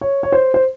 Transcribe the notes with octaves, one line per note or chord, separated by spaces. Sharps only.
C#5
C#5
C5
C5